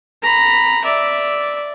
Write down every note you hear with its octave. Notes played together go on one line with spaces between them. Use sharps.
A#5 B5
D5 E5